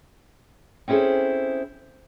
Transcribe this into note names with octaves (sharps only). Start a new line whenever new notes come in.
C4 C#4 E4 G#4 A4 C5